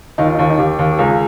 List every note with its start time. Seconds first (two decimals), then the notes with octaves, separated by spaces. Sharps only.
0.18 D#2 D#4
0.26 F4
0.35 D#4
0.39 D#2 F4
0.50 D#4
0.58 D#2 G4
0.79 D#2
0.92 G4
0.99 C#2 G#4